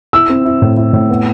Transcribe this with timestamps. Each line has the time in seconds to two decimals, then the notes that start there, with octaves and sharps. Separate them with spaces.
0.13 E4 E6
0.29 C4
0.45 E4
0.61 A2
0.77 E4
0.93 A2
1.09 B3